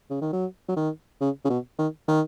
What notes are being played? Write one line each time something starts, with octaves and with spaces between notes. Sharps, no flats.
C#3
D#3
F#3
F#3
D#3
C#3
C#3
B2
D#3
D#3